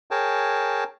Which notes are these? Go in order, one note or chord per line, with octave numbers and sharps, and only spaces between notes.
G#4 A#4 C#5 G5 A5